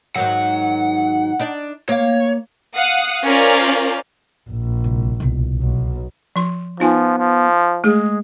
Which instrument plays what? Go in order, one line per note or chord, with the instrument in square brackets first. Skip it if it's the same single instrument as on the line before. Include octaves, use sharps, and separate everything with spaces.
[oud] G#2 D#3 F#3 [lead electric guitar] F#5
[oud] D4 D#4 D5
[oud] A#3 F5 [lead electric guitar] C#5
[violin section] F5 F#5 D#6
C#4 F4 A#4 C5 D5 F5
[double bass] A#1
[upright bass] C2 G3
C2 B2
[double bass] B1
[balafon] F3 C6
[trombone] F3 [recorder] B3 [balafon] D#4 F4 G#5
[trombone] F3
[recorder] G#3 [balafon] A3 G#4